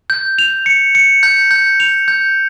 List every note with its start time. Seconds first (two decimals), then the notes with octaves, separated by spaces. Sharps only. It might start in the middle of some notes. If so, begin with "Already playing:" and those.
0.10 G6
0.38 F7
0.66 C#7
0.95 C#7
1.23 G6
1.51 G6
1.80 F7
2.08 G6